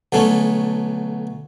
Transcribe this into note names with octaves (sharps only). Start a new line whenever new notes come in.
B1 D3 A3 C#4